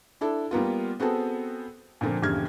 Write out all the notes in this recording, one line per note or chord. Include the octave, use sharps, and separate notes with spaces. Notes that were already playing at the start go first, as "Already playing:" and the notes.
D4 E4 A4
G3 A#3 B3 F4
B3 C4 F#4 G#4 A4
A#2 D3 F3 A#3 C4
D#1 E2 G2 C#3 F6 G#6